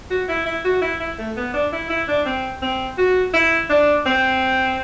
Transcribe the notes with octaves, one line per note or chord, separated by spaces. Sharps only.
F#4
E4
E4
F#4
E4
E4
A3
B3
D4
E4
E4
D4
C4
C4
F#4
E4
D4
C4